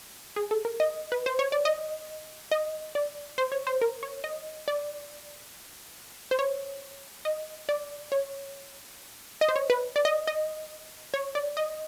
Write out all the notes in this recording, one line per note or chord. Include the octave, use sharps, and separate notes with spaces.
G#4
A4
A#4
D#5
B4
C5
C#5
D5
D#5
D#5
D5
C5
C#5
C5
A#4
C#5
D#5
D5
C5
C#5
D#5
D5
C#5
D#5
C5
C#5
B4
D5
D#5
D#5
C#5
D5
D#5